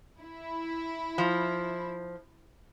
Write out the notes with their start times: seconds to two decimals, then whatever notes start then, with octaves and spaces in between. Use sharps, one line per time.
0.22 E4
1.18 F3